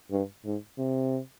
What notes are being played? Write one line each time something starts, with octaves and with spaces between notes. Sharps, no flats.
G2
G#2
C3